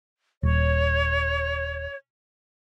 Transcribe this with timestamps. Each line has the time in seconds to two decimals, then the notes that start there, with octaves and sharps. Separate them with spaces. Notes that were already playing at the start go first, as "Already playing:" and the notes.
0.43 D#1 C#5